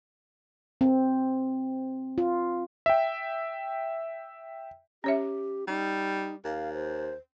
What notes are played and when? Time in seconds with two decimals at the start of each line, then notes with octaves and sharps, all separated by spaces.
0.81 C4
2.18 F4
2.86 E5 G5
5.04 C#4 G4 C#5 E5
5.68 G3 D#4
6.45 D#2 F5
6.74 C5